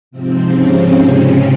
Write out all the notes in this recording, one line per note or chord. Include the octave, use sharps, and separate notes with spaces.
G#2 C3 F3 C4
C#3 C#4